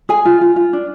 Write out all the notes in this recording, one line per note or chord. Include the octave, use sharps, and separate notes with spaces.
G#4 G#5
F4
F4
F4
D4